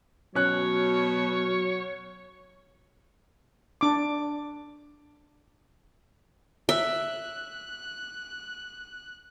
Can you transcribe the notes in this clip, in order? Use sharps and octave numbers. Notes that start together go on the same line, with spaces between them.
B2 F#3 C#4 C#5 F#6
D4 D6
E5 F#6